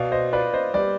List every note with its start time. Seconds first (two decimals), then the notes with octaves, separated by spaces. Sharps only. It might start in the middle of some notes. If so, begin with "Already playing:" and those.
Already playing: B2 D5 F5
0.12 C5 D#5
0.33 F4 B4 D5
0.54 C5 D#5
0.74 G3 B4 D5